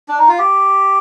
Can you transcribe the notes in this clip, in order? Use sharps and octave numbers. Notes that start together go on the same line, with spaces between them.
D4
D#4
F4
G4